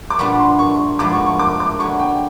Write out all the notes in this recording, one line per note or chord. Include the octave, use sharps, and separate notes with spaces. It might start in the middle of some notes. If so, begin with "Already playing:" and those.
D6
A#2 G3 B3 D4 C#6
C6
C#6
G#2 F3 G#3 B3 D6
C#6
C#6
D6
D6
D3 F#3 B3 C#6
G5